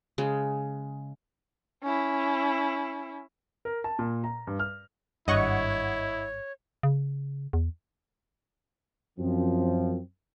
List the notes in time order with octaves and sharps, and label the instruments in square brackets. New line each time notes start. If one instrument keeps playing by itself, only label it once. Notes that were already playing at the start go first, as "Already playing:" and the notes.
[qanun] C#3 G#3
[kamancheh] C#4 E4
[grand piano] A#4
A5
A#2
A#5
G2
F6
[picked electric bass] G#1 G2 [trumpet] E4 [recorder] C#5 [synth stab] D#5 F#5 C#6
[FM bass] C#3
E2
[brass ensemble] F#2 F3 C4